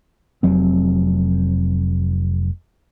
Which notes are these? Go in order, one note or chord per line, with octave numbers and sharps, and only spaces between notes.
F1 F#3 C4